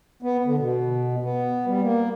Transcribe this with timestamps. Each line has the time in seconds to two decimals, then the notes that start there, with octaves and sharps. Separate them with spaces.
0.22 B3
0.46 D3
0.58 B2
1.23 B3
1.66 G3
1.82 A#3